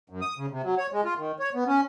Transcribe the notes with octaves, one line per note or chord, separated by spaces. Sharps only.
F#2
D#6
C#3
C3
F#3
C#5
G#3
F4
D#3
C#5
B3
C#4